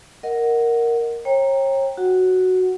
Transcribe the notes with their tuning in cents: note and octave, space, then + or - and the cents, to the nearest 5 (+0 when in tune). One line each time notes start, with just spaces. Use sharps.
A#4 +0 D#5 +0 F#5 +0
C#5 -35 G5 +5 A#5 +0
F#4 +0 F#5 +5